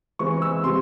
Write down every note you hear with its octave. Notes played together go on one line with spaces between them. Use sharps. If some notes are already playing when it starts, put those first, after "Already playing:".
E3 G#3 C4 C#6
E6
C3 G3 C6